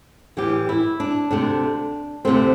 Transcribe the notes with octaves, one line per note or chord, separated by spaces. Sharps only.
A2 E3 G3 G4
E4
D4
D2 C3 A3 D4
D2 C3 A3 C4